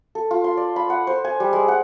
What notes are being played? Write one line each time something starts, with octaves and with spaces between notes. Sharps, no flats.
A4
F4
C6
D5
B5
F#5
C5
G#5
G3
G#3
F#5